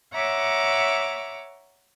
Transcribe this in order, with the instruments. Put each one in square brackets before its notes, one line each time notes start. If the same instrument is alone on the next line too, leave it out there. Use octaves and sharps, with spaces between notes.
[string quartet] C#5 E5 F#5 A#5 D6